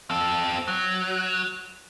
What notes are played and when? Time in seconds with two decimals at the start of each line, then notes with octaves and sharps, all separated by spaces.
0.10 C4 A4
0.68 F#3